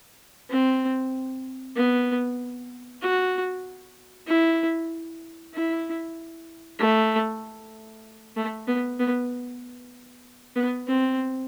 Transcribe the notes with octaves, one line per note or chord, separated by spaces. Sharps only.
C4
B3
F#4
E4
E4
A3
A3
B3
B3
B3
C4